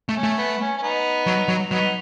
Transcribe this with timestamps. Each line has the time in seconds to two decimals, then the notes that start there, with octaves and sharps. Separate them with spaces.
0.09 A3
0.16 C#4
0.23 A3
0.38 B3
0.61 C#4
0.78 C#4
0.82 B3 D#4
1.26 F#3
1.48 F#3
1.70 F#3 B3 D#4